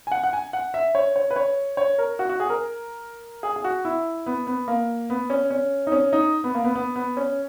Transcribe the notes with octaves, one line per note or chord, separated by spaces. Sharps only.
G#5
F#5
F#5
G#5
F#5
E5
C#5
C#5
B4
C#5
C#5
A#4
F#4
F#4
G#4
A#4
G#4
G#4
F#4
E4
B3
B3
A#3
B3
C#4
C#4
D#4
C#4
D#4
B3
A#3
B3
B3
B3
C#4